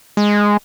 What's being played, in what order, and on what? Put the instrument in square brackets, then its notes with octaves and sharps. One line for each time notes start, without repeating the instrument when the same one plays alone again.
[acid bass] G#3